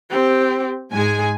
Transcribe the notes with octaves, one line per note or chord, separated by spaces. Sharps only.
C4 G4
G#2 G#3 G#4 G#5